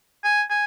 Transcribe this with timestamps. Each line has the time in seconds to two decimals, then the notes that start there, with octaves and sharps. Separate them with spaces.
0.24 G#5
0.50 G#5